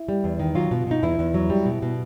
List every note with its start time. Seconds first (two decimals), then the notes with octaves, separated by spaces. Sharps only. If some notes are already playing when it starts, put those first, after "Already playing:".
Already playing: E4
0.08 G3
0.24 E2
0.39 D#3
0.55 F#3 F4
0.71 B2
0.87 B2 D#4
1.03 E2 E4
1.19 E2
1.34 F#3
1.50 G3
1.66 B2
1.82 B2